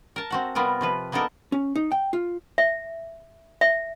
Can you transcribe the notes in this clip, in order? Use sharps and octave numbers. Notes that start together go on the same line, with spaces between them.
A#4 A5
C4 F#4 F#5
C3 G3 B3 F4 A#4
C3 F3 B4
A#3 B3 D4 D#4 A4 A#4
C#4
D#4
G5
F4
E5
E5